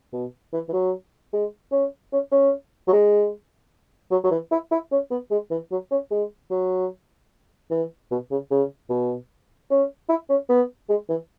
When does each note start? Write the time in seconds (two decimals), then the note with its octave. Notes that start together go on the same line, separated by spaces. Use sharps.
0.13 B2
0.53 E3
0.69 E3
0.73 F#3
1.33 G#3
1.72 C#4
2.12 C#4
2.32 C#4
2.87 F#3
2.93 G#3
4.11 F#3
4.24 F#3
4.31 E3
4.51 E4
4.71 E4
4.92 C#4
5.11 B3
5.31 G#3
5.51 E3
5.71 F#3
5.91 C#4
6.11 G#3
6.50 F#3
7.71 E3
8.11 B2
8.31 C#3
8.51 C#3
8.89 B2
9.70 C#4
10.09 E4
10.30 C#4
10.49 B3
10.89 G#3
11.09 E3